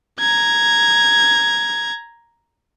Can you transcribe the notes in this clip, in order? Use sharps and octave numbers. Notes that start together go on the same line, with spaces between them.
A#5 G#6